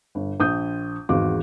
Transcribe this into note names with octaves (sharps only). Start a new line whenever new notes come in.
G1
A#1 D#6 G6
G#1 E2 F#4 G#4 F5 D6